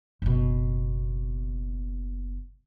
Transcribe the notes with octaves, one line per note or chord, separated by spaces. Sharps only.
F#1 B2